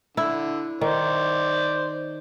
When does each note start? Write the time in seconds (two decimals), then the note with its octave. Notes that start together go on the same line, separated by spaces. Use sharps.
0.17 D3 E4
0.81 D#3 C5 D5